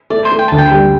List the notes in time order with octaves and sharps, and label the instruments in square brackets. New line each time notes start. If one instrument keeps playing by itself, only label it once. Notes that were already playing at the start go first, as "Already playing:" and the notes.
[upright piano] A3 [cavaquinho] D5
[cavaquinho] C5
[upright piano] A3
[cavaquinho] G5
[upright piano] D2 [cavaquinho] A5
[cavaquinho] G5
[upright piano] G3